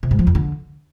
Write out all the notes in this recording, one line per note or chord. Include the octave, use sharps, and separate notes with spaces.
C3
G#2
F3
F2
D3